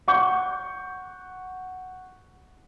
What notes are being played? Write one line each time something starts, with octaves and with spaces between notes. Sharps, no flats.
F#5 C#6 G6